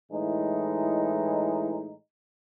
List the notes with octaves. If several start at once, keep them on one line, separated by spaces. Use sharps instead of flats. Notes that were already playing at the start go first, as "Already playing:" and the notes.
A2 E3 G#3 D#4